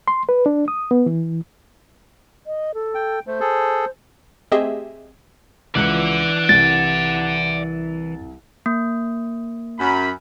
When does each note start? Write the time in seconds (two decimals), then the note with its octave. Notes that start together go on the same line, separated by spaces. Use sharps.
0.08 C6
0.29 B4
0.46 D4
0.68 D#6
0.91 B3
1.06 E3
2.46 D#5
2.74 A4
2.95 G5
3.27 A3 C5
3.40 G#4 A4
4.52 A3 C4 G4 G#4 D#5 E5
5.75 C#2 E3 F3 D5 F#5 C#7
6.49 C2 A6
8.66 A#3
9.79 F#2 B5